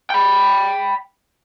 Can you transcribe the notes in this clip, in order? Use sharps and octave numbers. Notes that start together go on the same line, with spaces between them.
G5 B5